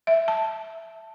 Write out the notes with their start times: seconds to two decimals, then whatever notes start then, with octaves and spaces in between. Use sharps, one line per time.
0.07 E5
0.28 A5